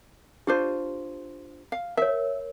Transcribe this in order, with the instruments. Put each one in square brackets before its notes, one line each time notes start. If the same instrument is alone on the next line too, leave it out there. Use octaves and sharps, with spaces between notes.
[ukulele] D4 F4 C5 [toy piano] G4
[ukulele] F5
[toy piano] A#4 C#5 [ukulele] E5